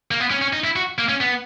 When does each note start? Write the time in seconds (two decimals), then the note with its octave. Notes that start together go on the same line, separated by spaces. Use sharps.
0.11 A#3
0.20 B3
0.31 C#4
0.42 C#4
0.53 D#4
0.64 E4
0.76 F#4
0.98 A#3
1.09 C#4
1.21 B3